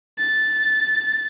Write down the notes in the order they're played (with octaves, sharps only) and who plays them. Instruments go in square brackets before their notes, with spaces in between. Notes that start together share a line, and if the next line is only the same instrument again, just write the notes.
[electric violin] A6